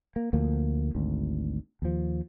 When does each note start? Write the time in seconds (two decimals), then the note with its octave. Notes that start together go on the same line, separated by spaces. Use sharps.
0.16 A#3
0.33 D2 F3 A3 A#3
0.95 G#1 D2
1.82 D#2 F3